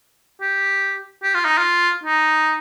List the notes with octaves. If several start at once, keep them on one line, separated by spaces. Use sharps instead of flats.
G4
G4
F4
D#4
F4
D#4